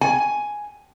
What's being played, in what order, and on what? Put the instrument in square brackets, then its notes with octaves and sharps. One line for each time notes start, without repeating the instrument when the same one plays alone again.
[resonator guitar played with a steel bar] G#5